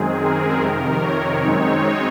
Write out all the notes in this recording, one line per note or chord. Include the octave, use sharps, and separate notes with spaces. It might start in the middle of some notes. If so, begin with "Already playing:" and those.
Already playing: F#2 D#3 G#3 C4 G#4
A#4
F2 C3 D#3
C#5
F#2 D#3 G#3 C4 D#4